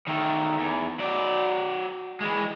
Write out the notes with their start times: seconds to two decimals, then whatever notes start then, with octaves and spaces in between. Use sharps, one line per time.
0.07 D#3 A3
0.58 E2
1.00 F#3 D5
2.21 E3 G#3